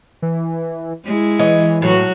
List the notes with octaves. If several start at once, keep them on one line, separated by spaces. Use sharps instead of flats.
E3
G#3 E4
E3 C#5 D#5
A2 F#3 F#4